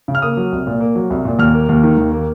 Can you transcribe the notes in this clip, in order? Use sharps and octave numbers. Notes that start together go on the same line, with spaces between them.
C#3
F6
A#3 D#6
F#3
C2
A#2
A#3
F#3
C2
A#2
D#2 F6
A#3
D#2
D#3
D#2
A#3